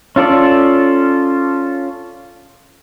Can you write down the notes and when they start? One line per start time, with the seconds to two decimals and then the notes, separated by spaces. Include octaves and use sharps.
0.16 C#4 F4 A4 D5